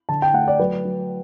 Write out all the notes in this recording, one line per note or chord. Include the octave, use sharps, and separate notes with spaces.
D3 A5
G5
A3 F#5
D5
F#3 B4
F#3